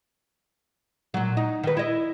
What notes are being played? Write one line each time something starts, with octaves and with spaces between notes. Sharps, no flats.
A#2 F#3
D#4
D#3 B4
E4 D#5